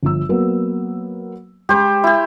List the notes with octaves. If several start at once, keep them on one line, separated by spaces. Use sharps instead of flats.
G1 F3 E6
F#3 A#3 B3
G#3 G4 C5 B5
E4 G4